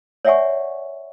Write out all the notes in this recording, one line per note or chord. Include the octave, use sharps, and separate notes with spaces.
C#5 D5 E5 F#5 G#5 C#6